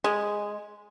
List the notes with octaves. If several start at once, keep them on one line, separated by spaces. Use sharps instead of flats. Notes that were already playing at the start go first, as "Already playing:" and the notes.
G#3